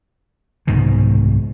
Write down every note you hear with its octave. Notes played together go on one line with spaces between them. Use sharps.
C2 G#2 B2 D#3